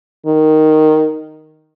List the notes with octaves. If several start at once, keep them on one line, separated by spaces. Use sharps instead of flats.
D#3